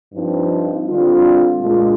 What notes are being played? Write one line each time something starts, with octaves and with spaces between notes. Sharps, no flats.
G2 F3 C4 D#4
D3 G3 C4 F4
A#2 G#3 D4 F4